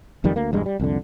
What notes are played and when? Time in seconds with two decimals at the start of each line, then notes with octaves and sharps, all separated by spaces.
0.24 F#1 F2 D#3 G3
0.36 D2 A#3
0.53 E1 G2 G#3
0.66 G3
0.80 C2 F2 D3